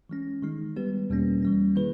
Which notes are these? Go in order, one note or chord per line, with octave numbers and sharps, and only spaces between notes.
E3 G#3 C#4
D#3 G#3 D#4
G3 B3 G4 B4
E2 B2 G3 A#3 C#4
E3 G3 C#4
D#3 A#3 E4 G#4 B4